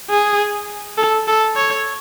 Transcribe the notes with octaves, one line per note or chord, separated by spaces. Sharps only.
G#4
A4
A4
C#5